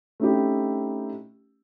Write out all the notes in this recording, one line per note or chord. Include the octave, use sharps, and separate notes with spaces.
A3 C4 C#4 D#4 E4 G4